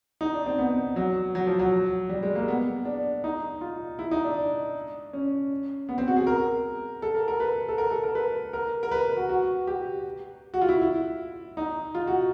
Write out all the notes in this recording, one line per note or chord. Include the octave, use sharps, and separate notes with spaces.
D#4
D4
C4
B3
F#3
F#3
F3
F#3
G3
G#3
A#3
B3
D4
D#4
F4
E4
D#4
D4
C#4
B3
C4
F#4
G#4
A#4
A4
A#4
A#4
B4
A4
A#4
A4
A#4
B4
A#4
A#4
B4
F#4
F#4
G4
F#4
F4
E4
E4
D#4
F4
F#4